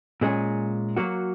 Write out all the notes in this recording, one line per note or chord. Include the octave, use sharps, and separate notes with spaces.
A#2 G#3 C#4
F#3 A#3 F#4